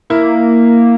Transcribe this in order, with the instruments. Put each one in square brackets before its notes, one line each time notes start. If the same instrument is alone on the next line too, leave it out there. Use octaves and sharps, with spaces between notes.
[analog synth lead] A#3 [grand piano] E4